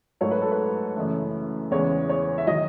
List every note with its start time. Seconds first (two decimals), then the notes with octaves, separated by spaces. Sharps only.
0.21 G#2 F#3 A3 C#5
0.31 B4
0.42 A4
0.52 B4
0.96 F#2 C#3 E3 A3
1.71 E2 C#3 E3 G#3 C#5
2.09 C#5
2.38 E5
2.47 D#3 F#3 D#5